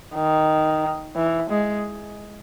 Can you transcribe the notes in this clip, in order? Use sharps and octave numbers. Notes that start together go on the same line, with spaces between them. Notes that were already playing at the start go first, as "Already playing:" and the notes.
D#3
E3
G#3